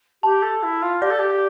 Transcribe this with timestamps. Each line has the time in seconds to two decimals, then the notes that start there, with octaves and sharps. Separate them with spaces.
0.23 G4 A5
0.42 A4
0.62 E4
0.82 F4
1.01 G4 D5
1.10 A4
1.19 G4